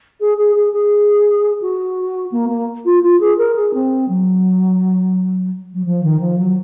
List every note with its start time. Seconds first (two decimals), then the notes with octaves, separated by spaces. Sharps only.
0.20 G#4
0.38 G#4
0.55 G#4
0.72 G#4
1.61 F#4
2.32 A#3
2.49 A#3
2.85 F4
3.03 F4
3.20 G#4
3.38 A#4
3.55 G#4
3.74 C4
4.08 F#3
5.73 F#3
5.85 F3
6.03 D#3
6.20 F3
6.38 F#3